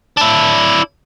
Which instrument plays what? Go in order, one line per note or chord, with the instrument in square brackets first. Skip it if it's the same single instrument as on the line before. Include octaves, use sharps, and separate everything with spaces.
[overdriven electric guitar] D4 E4